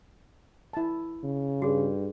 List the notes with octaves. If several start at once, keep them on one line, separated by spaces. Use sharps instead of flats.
E4 A5
C#3
G2 F#4 G#4